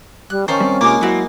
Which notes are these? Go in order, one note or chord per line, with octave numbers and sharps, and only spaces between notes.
G3 F#6
D#3 C#4 C5 F5 A5
G3 C4
C3 G#3 A#3 F4 D6
F#3 B3 C4 E4 F#4